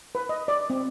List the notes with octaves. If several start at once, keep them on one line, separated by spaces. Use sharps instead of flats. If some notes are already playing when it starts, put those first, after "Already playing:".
B4
D#5
D5
C4